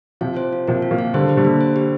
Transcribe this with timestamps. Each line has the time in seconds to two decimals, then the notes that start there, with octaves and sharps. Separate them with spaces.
0.21 C3 F3 F5
0.37 C5
0.53 F4
0.68 C3 F3 A#4
0.82 F4
0.91 F3 A#3
0.99 F5
1.14 D3 G3 C5
1.29 G4
1.37 D3 G3
1.45 A#3
1.61 C5
1.76 G4